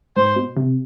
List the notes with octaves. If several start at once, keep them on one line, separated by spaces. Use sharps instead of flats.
G#2 C5
B2
C3